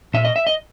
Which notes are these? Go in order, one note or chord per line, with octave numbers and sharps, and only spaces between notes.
A#2 E5
D#5
E5
D#5